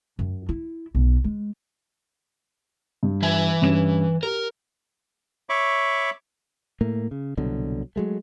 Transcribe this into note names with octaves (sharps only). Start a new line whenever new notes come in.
F#2
E4
B1
G#3
G2
E3 E5 G#5
G2 C#4 E7
G4 A#4
C#5 E5 B5 C#6 D6
A2 A3 A#3
C#3
C2 B2 D3 F#3
F#3 G#3 A3